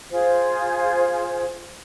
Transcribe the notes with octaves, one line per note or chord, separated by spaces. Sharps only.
F4 G#4 C5